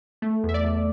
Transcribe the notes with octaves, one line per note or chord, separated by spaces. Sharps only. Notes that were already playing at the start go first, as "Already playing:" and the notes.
A3
E2
E5
D5
E2